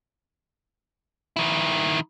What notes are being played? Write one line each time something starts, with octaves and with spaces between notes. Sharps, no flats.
D#3 E4